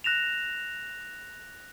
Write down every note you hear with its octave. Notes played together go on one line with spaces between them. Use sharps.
F#6 A#6 E7 F7